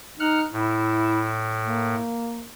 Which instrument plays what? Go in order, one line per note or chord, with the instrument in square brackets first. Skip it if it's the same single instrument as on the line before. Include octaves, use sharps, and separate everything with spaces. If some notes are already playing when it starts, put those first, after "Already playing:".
[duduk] D#4 [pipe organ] F#5 F6 F#6
[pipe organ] A2 [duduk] E4
[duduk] A#3